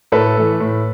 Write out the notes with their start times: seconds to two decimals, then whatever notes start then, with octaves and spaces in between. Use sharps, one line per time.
0.12 A2 A4 B4
0.37 E3 A3
0.60 A2